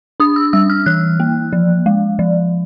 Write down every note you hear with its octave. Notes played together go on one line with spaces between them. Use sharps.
D4 D#6
E6
G3 E6
F6
E3 F#6
A#3
F3
G#3
F3